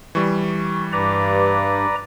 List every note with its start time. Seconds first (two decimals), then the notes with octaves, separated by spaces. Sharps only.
0.15 E3 G3 C#6
0.93 G2 B4 D5 A#5 D6